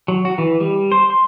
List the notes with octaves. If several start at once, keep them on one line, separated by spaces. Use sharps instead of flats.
F#3
F#4
E3
G3
C5
C6